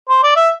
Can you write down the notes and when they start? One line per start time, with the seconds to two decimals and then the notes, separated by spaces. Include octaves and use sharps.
0.09 C5
0.23 D5
0.36 E5